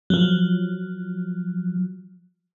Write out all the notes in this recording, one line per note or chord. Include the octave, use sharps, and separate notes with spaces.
F3 F#3